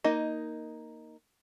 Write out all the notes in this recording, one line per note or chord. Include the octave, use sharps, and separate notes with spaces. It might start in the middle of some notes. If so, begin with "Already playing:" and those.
A#3 D#4 D#5